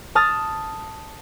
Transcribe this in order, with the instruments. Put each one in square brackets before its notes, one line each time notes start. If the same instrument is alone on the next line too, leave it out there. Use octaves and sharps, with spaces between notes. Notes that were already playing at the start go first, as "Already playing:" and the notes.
[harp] A5 D#6 F6 A6